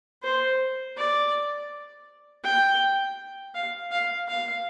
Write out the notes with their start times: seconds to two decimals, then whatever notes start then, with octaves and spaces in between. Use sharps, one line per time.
0.23 C5
0.97 D5
2.44 G5
3.54 F5
3.92 F5
4.28 F5